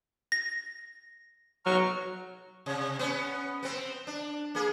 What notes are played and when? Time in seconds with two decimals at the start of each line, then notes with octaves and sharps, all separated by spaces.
0.32 A#6
1.66 F#3 A#5 C#6 F6
2.66 C3
2.99 B3 C#4
3.63 B3 C4
4.07 D4
4.55 A#3 G#4